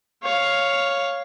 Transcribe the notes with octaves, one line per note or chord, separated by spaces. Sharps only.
C#5 F5